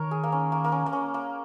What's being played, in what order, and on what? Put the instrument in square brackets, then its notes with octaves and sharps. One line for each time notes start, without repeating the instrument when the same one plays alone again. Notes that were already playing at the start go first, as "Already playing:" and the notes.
Already playing: [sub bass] D#3 [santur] A#4 C#5
[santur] G#4
A#3
C#4
A#3
A#3
C#4
A#3
C#4
A#3